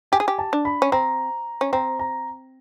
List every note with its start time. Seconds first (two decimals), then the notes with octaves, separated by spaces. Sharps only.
0.12 G4 G#5
0.20 G#4
0.28 G4
0.39 A5
0.53 D4
0.65 B5
0.82 C#4
0.92 C4 A#5
1.61 C#4
1.73 C4 A#5
1.99 A#5